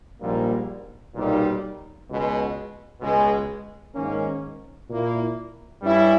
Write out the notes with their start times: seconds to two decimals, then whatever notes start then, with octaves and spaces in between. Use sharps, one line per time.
0.20 A#1 G#2 G3 A#3
1.14 B1 A#2 G3 A#3 D#4
2.08 C#2 B2 G#3
3.00 C#2 B2 G#3
3.94 G#2 D#3 A#3 C#4
4.88 A#2 A#3 E4
5.81 G2 G3 C#4 E4